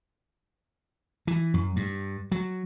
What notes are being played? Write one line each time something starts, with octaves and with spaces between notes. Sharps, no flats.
E3
F#2
G2
F#3